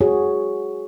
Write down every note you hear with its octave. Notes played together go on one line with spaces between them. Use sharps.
F#4 G#4 C#5